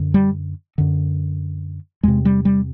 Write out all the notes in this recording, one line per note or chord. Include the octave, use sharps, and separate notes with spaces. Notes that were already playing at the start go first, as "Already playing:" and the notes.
Already playing: F#2 D3
G3
F#2 D3
E2 C3 G#3
G3
G3